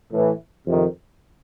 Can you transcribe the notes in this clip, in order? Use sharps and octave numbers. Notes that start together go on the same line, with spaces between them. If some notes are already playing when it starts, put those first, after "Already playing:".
A2 E3
F2 C3 D#3